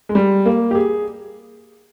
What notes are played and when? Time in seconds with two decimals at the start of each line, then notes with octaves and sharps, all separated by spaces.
0.09 G#3
0.15 G3
0.46 A#3
0.71 G4
0.75 G#4